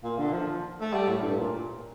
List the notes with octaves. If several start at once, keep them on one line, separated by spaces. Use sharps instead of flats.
A#2
D3
F3
A3
G3
A2
G2
A#2